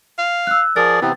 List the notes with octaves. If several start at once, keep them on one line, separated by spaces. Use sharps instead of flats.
F5
E6 F#6
F3 G#4 A#4 D5 A6
C3 E3 B3 C4